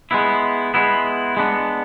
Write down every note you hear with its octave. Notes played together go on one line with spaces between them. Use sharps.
G#3 B3 E4
G#3 B3 E4
G#3 B3 D4